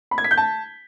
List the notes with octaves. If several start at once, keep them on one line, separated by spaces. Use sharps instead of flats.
B5
G#6
B6
G6
A5